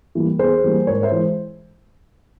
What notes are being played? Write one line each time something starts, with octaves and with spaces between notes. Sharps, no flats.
E3 G3 A#3
E2 G#4 C5
E3 G3 A#3
G#2 A#4 C#5
C5 E5
E3 G#3